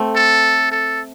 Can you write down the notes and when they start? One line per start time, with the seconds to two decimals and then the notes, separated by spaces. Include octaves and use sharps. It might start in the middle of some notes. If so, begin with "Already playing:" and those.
Already playing: A3 C4
0.16 A4
0.71 A4